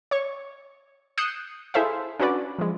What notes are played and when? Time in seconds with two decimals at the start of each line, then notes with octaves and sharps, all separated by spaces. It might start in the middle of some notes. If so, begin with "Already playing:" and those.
0.11 C#5 C#6
1.18 D#6 F#6 G6 C7 C#7 E7
1.74 E4 G#4 A4 C5 E5 F5
2.19 C#4 D4 F#4 B4 D5
2.59 F3 G#3